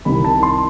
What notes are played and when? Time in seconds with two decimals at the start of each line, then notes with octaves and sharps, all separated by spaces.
0.05 C2 C3 D#3 G3 B5
0.24 A5
0.43 C6